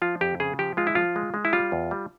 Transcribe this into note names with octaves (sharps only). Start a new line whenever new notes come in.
F3 F4
F2 G4
C#3 G#4
F3 G4
G#3 F4
E4
F3 F4
G#3
G#3
E4
G3 F4
E2
G3